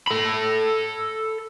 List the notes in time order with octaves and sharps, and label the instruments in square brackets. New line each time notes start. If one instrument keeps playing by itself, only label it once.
[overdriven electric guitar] A4 B5